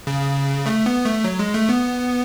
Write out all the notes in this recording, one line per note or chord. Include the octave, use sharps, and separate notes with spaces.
C#3
A3
B3
A3
F#3
G#3
A3
B3